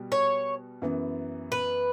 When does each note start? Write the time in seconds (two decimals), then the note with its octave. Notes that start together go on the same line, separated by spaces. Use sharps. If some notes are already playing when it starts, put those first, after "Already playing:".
Already playing: B2 G3 B3 F#4
0.12 C#5
0.82 F#2 E3 B3
1.52 B4